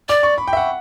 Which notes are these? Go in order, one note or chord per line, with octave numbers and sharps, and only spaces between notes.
D5 D6
C#6
B5
G5
E5
F#5